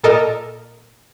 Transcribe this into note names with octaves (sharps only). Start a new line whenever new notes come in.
A#2 A4 A#4 D#5